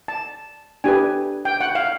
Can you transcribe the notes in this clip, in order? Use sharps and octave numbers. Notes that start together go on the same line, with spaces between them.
A5
D4 G4 B4 G#5
G5
F#5
F5